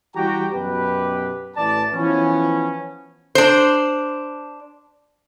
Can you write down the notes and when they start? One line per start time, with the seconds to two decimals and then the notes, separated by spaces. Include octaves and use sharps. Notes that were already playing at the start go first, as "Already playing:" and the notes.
0.15 E3 G3 F#4 G4 G5 A#5
0.52 F#2 B2 G4 B4
1.56 A1 E3 D5 A5
1.94 E3 F3 B3 C#4
3.35 D4 C5